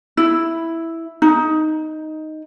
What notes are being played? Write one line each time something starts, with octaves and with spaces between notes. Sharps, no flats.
E4
D#4